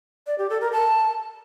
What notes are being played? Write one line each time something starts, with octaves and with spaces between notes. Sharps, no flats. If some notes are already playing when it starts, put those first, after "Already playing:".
D5
G4
A4
A#4
A5